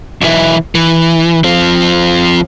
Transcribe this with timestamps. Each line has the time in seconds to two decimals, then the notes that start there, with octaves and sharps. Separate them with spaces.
0.22 B1 E3
0.75 E3
1.44 F3 C4